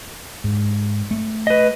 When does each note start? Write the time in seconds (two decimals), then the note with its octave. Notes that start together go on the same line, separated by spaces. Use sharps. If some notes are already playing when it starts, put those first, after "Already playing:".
0.44 G#2
1.11 A3
1.47 B4 D#5